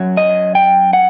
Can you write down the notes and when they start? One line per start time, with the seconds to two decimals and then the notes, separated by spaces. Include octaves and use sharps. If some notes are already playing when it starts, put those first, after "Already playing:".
Already playing: F#2 F#3
0.17 D#5
0.55 G5
0.93 F#5